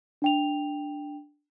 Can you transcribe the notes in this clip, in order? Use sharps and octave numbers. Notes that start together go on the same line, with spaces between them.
D4 G5 F7